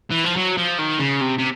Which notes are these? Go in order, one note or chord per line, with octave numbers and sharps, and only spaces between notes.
E3
F3
F#3
F3
D#3
C#3
C3
C3